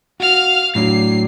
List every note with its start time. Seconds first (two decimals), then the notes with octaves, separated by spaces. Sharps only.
0.20 F#4 F5 F6
0.75 A2 F#3 D4 C7